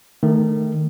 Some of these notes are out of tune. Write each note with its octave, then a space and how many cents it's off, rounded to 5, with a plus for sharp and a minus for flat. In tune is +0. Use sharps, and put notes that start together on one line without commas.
D#3 -10 A3 -5